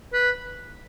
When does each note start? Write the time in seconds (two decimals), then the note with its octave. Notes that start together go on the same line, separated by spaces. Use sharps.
0.13 B4